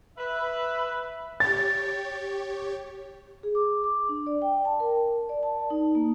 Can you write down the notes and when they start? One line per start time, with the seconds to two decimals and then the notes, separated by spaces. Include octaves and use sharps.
0.18 B4 E5
1.40 G4 C#5 A6
3.43 G#4
3.55 D6
3.84 D6
4.09 D4
4.27 D5
4.42 G5
4.65 A5
4.80 A#4
5.29 D5
5.43 A5
5.70 D#4
5.95 A#3